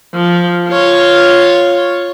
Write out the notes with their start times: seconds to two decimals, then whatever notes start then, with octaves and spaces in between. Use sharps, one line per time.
0.14 F3
0.68 F4 C#5